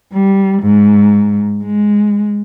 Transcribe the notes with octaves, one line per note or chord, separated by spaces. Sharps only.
G3
G#2
G#3